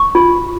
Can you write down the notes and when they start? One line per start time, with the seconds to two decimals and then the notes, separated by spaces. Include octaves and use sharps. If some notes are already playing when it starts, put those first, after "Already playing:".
Already playing: C#6
0.15 F4